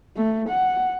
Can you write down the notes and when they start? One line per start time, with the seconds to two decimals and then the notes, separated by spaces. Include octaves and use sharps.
0.16 A3
0.48 F#5